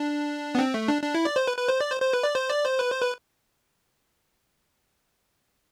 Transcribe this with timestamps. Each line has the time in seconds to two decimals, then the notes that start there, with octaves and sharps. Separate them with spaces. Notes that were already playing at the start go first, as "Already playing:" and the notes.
Already playing: D4
0.55 B3
0.59 C4
0.74 A3
0.88 D4
1.03 D4
1.15 E4
1.25 D5
1.36 C5
1.48 B4
1.58 B4
1.68 C5
1.81 D5
1.91 C5
2.01 C5
2.13 B4
2.23 D5
2.35 C5
2.50 D5
2.65 C5
2.79 B4
2.91 C5
3.01 B4